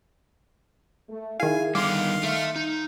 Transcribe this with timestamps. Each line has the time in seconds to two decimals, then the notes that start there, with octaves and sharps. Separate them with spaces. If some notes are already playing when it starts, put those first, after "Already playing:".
1.08 A3
1.40 D#3 E4 G#4 F5 G#5
1.75 D3 D#3 G3 F5 C6 D6 F6
2.23 A3 E5
2.56 D#4